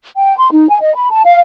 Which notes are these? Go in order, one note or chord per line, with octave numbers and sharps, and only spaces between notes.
G5
C6
D#4
G#5
D#5
B5
A5
F5